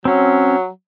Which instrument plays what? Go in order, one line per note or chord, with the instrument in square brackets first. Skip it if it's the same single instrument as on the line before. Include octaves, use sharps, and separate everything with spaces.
[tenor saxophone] F#3 [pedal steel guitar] C4 C#4